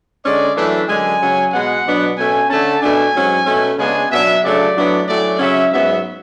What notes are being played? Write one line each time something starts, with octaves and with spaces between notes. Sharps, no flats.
D3 G#3 C#4 D5
F#2 E3 A3 D4 E5
F#2 D3 G#3 G#5
C#3 F#3 C#4
B2 G#3 B3 F#5
B2 F#3 B3 D4
B2 A3 C#4 G#5
D3 A3 C#4 A5
B2 A3 D4 G#5
G#2 F#3 C#4
B2 A3 C#4
C#3 G#3 B3 D4 G#5
B2 F#3 B3 D4 E5
C#3 F#3 A3 D4 D5
A2 F#3 B3 D4
A2 F#3 A3 C#4 D5
C#3 F#3 C#4 E5
G#2 F#3 B3 E5